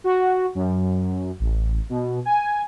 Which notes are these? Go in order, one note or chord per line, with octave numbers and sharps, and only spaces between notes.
F#4
F#2
A1
B2
G#5